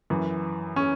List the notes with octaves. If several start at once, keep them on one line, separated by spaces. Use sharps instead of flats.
F#2 E3
C#4